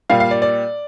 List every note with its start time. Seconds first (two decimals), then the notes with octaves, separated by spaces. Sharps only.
0.10 A#2 G3 F5
0.20 F5
0.31 D5
0.42 D5